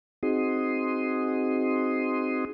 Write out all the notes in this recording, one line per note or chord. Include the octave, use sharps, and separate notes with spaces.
C4 D#4 F#4 G#4 C6 D#6